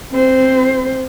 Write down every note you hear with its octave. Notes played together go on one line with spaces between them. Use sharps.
C4 C5